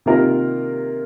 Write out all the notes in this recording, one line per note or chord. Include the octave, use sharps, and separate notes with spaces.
C3 D#3 A#3 F4 A#4